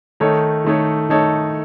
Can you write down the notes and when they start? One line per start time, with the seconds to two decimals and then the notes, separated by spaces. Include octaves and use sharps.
0.20 D#3 A3 D#4 A4 C#5
0.65 D#3 A3 D#4 A4 C#5
1.09 D#3 A3 D#4 A4 C#5